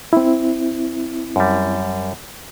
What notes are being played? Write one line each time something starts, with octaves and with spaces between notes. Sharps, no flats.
C4 E4
F#2 G3